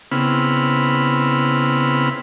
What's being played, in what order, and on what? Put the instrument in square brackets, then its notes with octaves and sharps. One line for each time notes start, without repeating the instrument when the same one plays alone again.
[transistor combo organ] C#3 B3 C4 E4 B5 F6